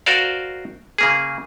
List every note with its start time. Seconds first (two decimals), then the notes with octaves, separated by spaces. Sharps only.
0.06 F#4 A#4 C5 D5 F5
0.98 C#3 A#3 G#4